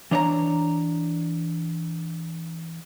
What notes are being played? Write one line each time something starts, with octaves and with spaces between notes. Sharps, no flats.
E3 D4 C#5 G5 A#5